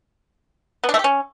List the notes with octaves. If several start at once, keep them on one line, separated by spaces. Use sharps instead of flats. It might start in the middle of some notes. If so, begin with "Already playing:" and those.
B3
D4
A3
G4
C#4